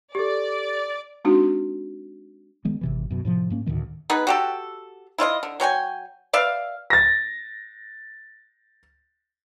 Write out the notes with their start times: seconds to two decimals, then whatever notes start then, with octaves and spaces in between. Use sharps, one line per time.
0.15 G4 A4 D5
1.25 G#3 C4 D4 D#4 F#4
2.65 D#3 G#3 B3
2.81 G#1 C3 E3
3.10 F#2 B2
3.25 A2 C3 F3
3.50 G#2 A#3 C#4
3.66 D2 A2 D#3 G#3
4.10 B3 D#4 G#4 B4
4.27 F#4 G4 A4
5.18 E4 F4 C#5 D#5
5.43 D3
5.60 F#3 C#5 G5 G#5
6.33 B4 D5 E5 F5
6.90 A6 A#6